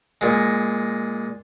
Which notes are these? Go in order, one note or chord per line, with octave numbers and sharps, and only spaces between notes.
A#2 G#3